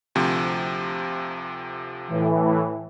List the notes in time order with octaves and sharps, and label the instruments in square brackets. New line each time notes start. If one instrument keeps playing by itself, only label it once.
[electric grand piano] D2 C3 F3
[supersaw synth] A2 E3